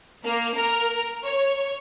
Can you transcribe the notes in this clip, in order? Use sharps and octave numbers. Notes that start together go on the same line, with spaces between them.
A#3
A#4
C#5